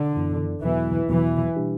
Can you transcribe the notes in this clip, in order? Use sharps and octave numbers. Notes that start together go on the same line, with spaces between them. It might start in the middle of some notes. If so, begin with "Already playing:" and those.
Already playing: D3
F#2 E3 B3 E4
E2 B2 E3 F#3 B3 F#4
E2 B2 E3 F#3 B3 F#4
B2 G3 D4 G4